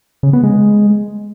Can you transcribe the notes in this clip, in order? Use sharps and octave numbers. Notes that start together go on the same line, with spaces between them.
C#3
B3
G#3